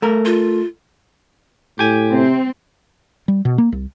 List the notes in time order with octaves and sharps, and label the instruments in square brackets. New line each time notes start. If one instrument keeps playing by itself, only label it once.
[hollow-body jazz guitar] A3 A#4
[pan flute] F4
[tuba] A2 [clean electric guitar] G4 G#5
[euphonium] C3 [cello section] C4
[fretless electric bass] G3
B2
A#3
C2